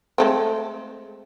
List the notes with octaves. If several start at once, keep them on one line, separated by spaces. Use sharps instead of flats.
G#3 A3 C4